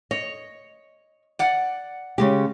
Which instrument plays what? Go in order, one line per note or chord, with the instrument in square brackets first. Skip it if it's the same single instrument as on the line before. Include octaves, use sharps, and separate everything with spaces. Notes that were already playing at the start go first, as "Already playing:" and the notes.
[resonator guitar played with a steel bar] C#5 [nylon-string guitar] D#5
[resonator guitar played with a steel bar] D5 F#5
[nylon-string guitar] C#3 G#3 G4